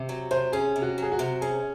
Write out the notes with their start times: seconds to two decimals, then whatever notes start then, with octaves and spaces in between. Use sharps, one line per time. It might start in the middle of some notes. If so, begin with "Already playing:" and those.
Already playing: C3
0.09 F#3
0.31 C3 C5
0.52 C#4 G#4
0.76 C3
0.82 F#4
0.98 F#3 G#4
1.12 F#4
1.19 C3
1.41 C#4 G#4